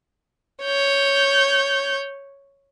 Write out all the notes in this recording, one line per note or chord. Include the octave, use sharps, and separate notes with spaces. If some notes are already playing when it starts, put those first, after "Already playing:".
C#5 G6